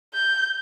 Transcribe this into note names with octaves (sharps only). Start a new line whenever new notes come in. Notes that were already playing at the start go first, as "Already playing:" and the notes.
G6